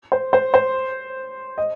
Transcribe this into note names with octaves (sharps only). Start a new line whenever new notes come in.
C5
C5
C5
D#5